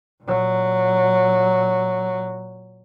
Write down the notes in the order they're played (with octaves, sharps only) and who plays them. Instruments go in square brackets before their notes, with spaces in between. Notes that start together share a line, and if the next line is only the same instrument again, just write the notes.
[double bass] A#2 F#3